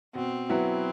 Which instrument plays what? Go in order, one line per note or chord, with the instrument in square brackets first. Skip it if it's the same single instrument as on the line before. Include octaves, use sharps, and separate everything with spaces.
[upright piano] B2 [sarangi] C4
[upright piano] F#3 B3 E4